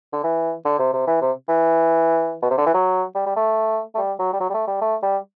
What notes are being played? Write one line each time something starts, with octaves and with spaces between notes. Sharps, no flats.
D3
E3
D3
C3
C3
E3
C3
E3
B2
C3
D3
E3
F#3
G3
G3
A3
A3
G3
F#3
G3
F#3
G3
A3
G3
A3
G3